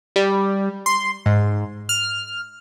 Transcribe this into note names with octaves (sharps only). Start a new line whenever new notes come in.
G3
C6
G#2
F6